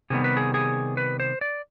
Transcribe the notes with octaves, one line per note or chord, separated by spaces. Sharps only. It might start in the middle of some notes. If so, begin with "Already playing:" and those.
C3 D#3 G3 B3 G#4
B4
G#4
G#4
B4
C5
D5